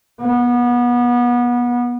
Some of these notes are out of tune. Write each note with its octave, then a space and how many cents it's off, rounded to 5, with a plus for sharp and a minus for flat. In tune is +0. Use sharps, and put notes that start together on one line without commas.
B3 -25